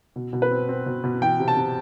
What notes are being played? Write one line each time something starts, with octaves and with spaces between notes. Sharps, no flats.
B2
B2
B4
C4
C4
B2
B2
E3 G5
C3
A5
C3